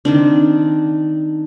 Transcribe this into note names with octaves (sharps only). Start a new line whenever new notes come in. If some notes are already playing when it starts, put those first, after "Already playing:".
D#3 C4 D4